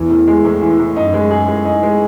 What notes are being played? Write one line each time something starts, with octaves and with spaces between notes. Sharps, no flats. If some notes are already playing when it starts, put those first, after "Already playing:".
Already playing: E2 E3
A2
G#3
A2
E3
A2
F#2 D#4
G#3
G#4
G#3
D#4
G#3